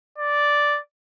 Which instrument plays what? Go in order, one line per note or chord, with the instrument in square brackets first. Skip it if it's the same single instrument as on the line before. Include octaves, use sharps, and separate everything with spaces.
[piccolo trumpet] D5